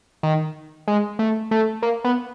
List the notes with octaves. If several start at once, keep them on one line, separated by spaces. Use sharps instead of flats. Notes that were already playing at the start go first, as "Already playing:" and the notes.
D#3
G#3
A3
A3
A#3
B3